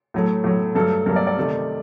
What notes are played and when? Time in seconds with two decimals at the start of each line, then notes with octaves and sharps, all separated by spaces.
0.14 A2 F#3 A3
0.44 A2 F#3 A3
0.75 G2 F#3 A3 A4
1.06 G2 F#3 A3 A#4
1.16 D5
1.27 D5
1.37 C3 D#3 A3